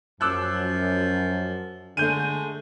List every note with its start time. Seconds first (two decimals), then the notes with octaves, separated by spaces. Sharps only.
0.21 F#2 F3 D6 E6 F#6
1.97 D3 G#3 A3 G6 D#7